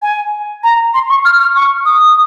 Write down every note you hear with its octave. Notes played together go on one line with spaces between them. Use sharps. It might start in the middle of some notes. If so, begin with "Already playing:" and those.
G#5
A#5
C6
C#6
F6
F6
C#6
D#6